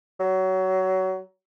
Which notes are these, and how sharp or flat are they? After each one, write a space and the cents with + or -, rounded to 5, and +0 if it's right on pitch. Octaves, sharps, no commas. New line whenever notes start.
F#3 +20